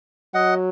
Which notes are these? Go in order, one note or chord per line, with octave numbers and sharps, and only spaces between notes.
F#3 D#5 F#5